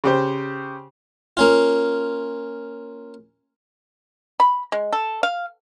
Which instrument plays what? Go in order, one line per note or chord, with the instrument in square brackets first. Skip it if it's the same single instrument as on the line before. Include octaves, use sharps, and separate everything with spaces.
[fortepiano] C#3 G4 C5
[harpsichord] A#3 C#4 F4
[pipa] B5
G#3
A4
F5